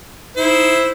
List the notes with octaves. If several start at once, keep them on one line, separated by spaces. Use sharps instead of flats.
D#4 E4 C5